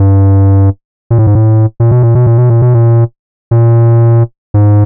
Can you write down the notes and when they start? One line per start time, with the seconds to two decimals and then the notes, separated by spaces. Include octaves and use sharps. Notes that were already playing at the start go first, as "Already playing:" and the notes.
Already playing: G2
1.10 A#2
1.18 A2
1.27 G#2
1.35 A2
1.80 A#2
1.91 B2
2.03 A#2
2.15 B2
2.27 A#2
2.38 B2
2.50 A#2
2.62 B2
2.74 A#2
3.51 A#2
4.54 G#2